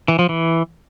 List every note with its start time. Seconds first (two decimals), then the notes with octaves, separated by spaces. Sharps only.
0.08 E3
0.19 F3
0.29 E3